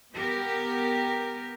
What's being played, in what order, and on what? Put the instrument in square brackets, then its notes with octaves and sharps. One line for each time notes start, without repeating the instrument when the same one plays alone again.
[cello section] B3 G4 A#4